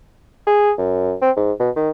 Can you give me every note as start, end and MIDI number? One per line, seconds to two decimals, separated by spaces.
0.47 0.72 68
0.78 1.15 42
1.22 1.31 60
1.37 1.52 44
1.59 1.70 47
1.76 1.90 51